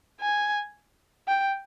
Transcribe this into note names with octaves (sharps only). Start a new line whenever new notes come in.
G#5
G5